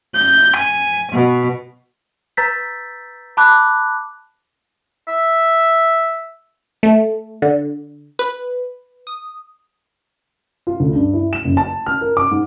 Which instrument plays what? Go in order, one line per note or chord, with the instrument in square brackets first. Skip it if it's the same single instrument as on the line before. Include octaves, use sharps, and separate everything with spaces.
[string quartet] G6
G#5
B2
[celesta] B4 A#5 E6 G6 A6 B6
A5 B5 D6 F#6
[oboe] E5
[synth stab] A3
D3
B4
D#6
[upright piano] F4
D2
G2
E4
E7
F#1
A5
F6
A#4
D6
G#2